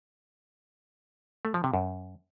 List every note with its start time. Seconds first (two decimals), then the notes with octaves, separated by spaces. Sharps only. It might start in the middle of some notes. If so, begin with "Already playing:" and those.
1.45 A3
1.54 F3
1.64 C3
1.74 F#2